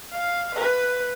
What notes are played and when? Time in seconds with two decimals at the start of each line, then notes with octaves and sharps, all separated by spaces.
0.12 F5
0.55 B4